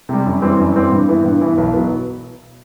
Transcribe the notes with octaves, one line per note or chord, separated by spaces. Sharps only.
C3 G3
F#2
E3 G3 C4
F#2
E3 G3 C4
G2
E3 B3 E4
G2
E3 B3 E4
B1
B2 F#3 B3